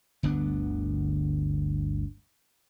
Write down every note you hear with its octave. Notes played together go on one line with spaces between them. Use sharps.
G1 D2 B3 D4